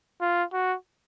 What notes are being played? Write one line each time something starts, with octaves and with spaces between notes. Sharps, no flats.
F4
F#4